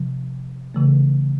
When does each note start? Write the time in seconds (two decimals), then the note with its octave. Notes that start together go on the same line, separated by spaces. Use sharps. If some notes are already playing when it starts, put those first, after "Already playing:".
Already playing: C3 F3
0.74 C#3 E3 A3